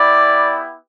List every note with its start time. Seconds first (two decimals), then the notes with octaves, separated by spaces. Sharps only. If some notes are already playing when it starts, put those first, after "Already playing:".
Already playing: B3 E4 G4 D5